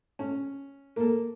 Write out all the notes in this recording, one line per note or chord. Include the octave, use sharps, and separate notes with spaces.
C#4
A#3 A4